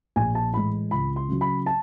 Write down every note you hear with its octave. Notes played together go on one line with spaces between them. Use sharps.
A#1 G#5
A5
A2 E3 G#3 B5
C#2 B5
C6
C#3 F#3
B5
A5